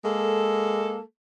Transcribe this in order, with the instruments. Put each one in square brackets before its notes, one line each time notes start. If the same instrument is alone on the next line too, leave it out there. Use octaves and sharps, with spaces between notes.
[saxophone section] G#3 A#3 A4